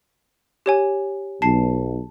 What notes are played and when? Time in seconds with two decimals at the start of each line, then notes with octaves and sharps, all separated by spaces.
0.66 G4 C#5 G#5
1.42 B1 A5 C7